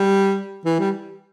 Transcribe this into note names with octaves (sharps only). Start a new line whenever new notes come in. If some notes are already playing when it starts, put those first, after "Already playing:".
Already playing: G3
E3
G3